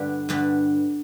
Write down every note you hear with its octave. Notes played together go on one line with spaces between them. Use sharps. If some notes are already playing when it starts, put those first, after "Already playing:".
Already playing: G2 D3 B3 D4 G4
G2 D3 B3 D4 G4